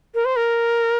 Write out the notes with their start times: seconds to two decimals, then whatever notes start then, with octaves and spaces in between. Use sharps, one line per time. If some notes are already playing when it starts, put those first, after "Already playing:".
0.14 A#4
0.25 C5
0.36 A#4